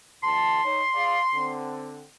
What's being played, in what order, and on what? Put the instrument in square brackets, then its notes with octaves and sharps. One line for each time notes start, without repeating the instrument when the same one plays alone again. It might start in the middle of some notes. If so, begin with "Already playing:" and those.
[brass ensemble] D2 A5 [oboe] C6
[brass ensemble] D#4 C#5
G#4 D5 F5
D3 C4